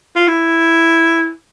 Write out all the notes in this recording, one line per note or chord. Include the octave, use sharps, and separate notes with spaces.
F4
E4